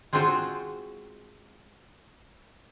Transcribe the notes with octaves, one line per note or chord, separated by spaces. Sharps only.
G#3 C4 D#4 F4 F#4